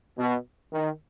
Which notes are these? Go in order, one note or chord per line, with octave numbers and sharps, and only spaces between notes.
B2
D#3